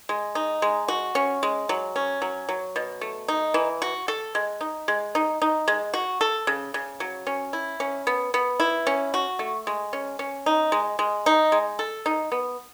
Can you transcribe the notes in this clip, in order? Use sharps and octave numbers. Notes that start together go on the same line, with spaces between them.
G#3
D#4
G#3
F#4
C#4
G#3
F#3
C#4
F#3
F#3
B2
A3
D#4
E3
F#4
A4
G#3
D#4
G#3
D#4
D#4
G#3
F#4
A4
C#3
C#3
F#3
C#4
E4
C#4
B3
B3
E4
C#4
F#4
A3
G#3
C#4
C#4
D#4
G#3
G#3
D#4
G#3
A4
D#4
B3